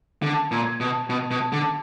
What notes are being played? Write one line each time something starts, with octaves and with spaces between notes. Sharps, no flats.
D3
A#2
B2
B2
B2
D3